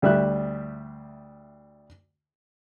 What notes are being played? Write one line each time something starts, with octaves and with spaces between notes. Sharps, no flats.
D2 G3 E5 F#6